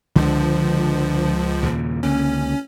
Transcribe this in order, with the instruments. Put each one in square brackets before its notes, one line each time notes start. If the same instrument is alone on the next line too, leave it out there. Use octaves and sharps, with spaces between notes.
[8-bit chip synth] C#2 F3 [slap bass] D3 D4
[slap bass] D#2 A#2 C#3
[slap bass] C#2 D3 A#3 [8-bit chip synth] C#4